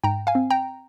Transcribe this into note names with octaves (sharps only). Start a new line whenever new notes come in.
G#2 G5 A#5
F5 G#5
C4
G5 A#5